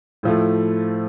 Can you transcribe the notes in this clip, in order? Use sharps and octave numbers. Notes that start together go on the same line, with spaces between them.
A2 F3 A3